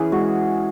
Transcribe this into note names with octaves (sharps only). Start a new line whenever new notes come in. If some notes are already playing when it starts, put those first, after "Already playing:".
Already playing: E3 C#4 G#4
G#3 F#4